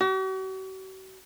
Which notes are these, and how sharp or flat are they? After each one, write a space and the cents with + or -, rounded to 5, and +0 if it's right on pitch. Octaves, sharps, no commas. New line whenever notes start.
F#4 +45